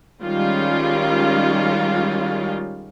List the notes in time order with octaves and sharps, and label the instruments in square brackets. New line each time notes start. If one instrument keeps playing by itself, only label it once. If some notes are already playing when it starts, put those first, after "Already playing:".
[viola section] D#3 G3 G#3 C#4 F4